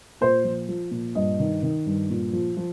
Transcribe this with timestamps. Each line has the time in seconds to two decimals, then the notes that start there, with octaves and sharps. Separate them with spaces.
0.21 A#2 C5
0.44 F3
0.69 F3
0.91 A#2
1.15 G2 D#5
1.40 D#3
1.63 D#3
1.86 G2
2.10 A#2
2.33 F3
2.57 F3